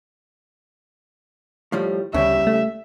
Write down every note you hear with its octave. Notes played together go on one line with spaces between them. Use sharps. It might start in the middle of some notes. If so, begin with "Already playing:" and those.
A2 F3 G3
D2 C#3 G3 E5
A3